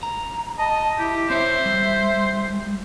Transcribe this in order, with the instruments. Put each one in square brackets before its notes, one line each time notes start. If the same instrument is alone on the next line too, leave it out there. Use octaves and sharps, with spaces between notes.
[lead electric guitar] A#5
[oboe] D#5 [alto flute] A5
[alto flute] E4 [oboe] G4
[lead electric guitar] C4 C#5 [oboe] C5 [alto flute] E5
[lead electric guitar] G3